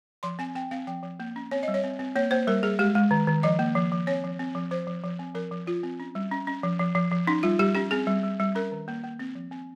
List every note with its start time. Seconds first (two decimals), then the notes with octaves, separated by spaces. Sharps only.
0.23 F3 C6
0.39 C4 G#5
0.55 C4 G5
0.71 C4 F5
0.87 F3 G5
1.03 F3
1.20 A#3
1.36 C#4
1.51 C4 C#5
1.63 G3 D#5
1.74 C#5
1.84 C4
1.99 C4
2.16 A#3 C#5
2.31 A#3 C5
2.47 G3 A#4
2.63 G3 G#4
2.79 G#3 G4
2.95 G#3
3.11 D#3
3.27 D#3
3.43 F3 D#5
3.59 A#3
3.75 F3
3.92 F3
4.07 C4 C#5
4.24 F3
4.39 C4
4.55 F3
4.71 F3 C5
4.87 F3
5.04 F3
5.19 C4
5.35 F3 A#4
5.51 F3
5.67 F3 F4
5.83 C4
6.00 C#4
6.15 G3
6.32 C#4
6.47 C#4
6.63 F3
6.79 F3
6.95 F3
7.11 F3
7.27 C#4 D#4
7.43 G3 F4
7.59 G3 G4
7.75 C#4 G4
7.91 C4 G#4
8.07 G3
8.23 G3
8.40 G3
8.55 C#4 A#4
8.72 D#3
8.88 A#3
9.04 A#3
9.19 C4
9.35 F3
9.51 C4